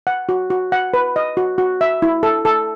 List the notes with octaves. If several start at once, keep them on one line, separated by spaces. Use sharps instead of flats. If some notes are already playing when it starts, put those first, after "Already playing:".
F#5
F#4
F#4
F#5
B4
D#5
F#4
F#4
E5
E4
A4
A4